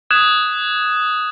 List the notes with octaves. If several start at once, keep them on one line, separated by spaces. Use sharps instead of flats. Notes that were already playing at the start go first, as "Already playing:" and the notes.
D#6 F#6 G#6 E7